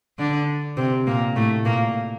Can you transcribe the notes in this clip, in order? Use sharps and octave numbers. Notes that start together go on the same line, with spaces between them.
D3 D4
C3 C4
A#2 A#3
A2 A3
A#2 A#3